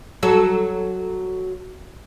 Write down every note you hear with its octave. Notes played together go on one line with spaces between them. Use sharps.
F#3 A4